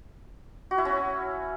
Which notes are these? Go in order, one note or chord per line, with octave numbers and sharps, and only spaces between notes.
F#4
E4
C#4